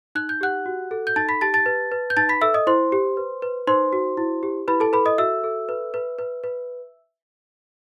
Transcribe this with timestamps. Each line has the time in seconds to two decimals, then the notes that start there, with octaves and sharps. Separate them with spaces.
0.15 D#4 F#6
0.29 G6
0.41 G4 F#5 F#6
0.66 F#4
0.91 A4
1.07 G6
1.16 D#4 A5 A6
1.29 B5 B6
1.41 G4 A5 A6
1.54 A5 A6
1.66 B4
1.92 B4
2.10 G6
2.17 D#4 A5 A6
2.29 B5 B6
2.41 A4 E5 E6
2.54 D#5 D#6
2.67 E4 C5 C6
2.92 G4
3.17 B4
3.42 B4
3.67 D#4 C5 C6
3.93 F#4
4.17 E4
4.43 G4
4.68 E4 B4 B5
4.80 A4 A5
4.93 A4 B4 B5
5.06 D#5 D#6
5.18 F#4 E5 E6
5.44 A4
5.69 B4
5.94 B4
6.19 B4
6.44 B4